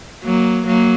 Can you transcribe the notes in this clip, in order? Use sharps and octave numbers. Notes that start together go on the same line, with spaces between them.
F#3 A#3
F#3 A#3